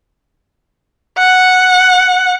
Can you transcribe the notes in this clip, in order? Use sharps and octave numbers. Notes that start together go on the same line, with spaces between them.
F#5